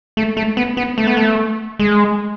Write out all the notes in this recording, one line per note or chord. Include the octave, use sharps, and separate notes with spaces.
A3
A3
B3
B3
A3
B3
A3
G#3